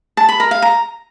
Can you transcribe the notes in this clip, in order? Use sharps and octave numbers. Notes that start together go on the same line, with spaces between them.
A5
B5
A#4
F5
A#5